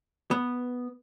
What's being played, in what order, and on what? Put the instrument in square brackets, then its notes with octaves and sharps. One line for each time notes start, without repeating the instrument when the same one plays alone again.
[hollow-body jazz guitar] B3